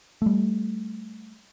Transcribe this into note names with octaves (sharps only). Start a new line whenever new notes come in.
G3 A3